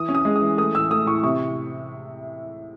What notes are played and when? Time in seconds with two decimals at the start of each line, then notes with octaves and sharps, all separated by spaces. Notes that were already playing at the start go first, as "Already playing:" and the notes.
Already playing: E3 D#6
0.09 C#4
0.15 D#6
0.25 G#3
0.36 D#6
0.42 E3
0.57 A3 D#6
0.75 A2 E6
0.90 A3 D#6
1.06 A2 C#6
1.23 C3 C#6